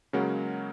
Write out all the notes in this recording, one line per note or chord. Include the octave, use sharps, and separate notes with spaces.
C#3 F#3 G#3 A#3 C#4